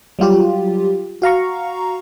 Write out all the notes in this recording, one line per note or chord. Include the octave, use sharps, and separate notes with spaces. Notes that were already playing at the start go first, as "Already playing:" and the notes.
F#3 G3 F4 G4
F#4 F5 A#5 C#6